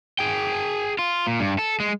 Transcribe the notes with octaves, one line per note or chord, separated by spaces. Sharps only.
G#4 G5
F4
A#2
G2
A4
G#3